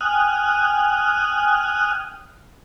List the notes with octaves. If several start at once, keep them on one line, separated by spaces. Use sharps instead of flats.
G5 G#5 D#6 F6 F#6